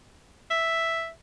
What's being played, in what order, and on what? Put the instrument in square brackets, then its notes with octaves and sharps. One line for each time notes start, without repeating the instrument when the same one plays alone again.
[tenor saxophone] E5